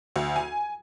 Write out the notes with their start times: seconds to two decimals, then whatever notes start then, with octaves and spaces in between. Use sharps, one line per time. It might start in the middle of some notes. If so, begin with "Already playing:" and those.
0.16 D2
0.36 G#5